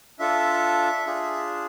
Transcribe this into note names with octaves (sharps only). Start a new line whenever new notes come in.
D4 F4 A4 E5
D4 F4 G#4